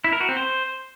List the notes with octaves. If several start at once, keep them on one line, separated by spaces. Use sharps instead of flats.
E4
A#4
F#4
C4
C5